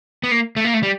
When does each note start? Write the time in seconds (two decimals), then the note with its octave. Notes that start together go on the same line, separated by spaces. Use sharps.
0.24 B3
0.31 A#3
0.56 A3
0.65 A#3
0.74 A3
0.83 G3